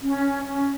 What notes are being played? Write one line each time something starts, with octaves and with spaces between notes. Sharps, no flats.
C#4
C#4